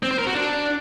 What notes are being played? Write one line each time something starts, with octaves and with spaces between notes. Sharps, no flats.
C4
C5
A#4
F#4
D4